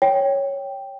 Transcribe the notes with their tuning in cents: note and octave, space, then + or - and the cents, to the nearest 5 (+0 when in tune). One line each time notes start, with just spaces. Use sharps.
C#5 +0 G5 +0